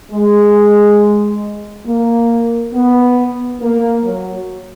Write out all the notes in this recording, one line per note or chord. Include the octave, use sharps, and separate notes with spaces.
G#3
A#3
B3
A#3
F#3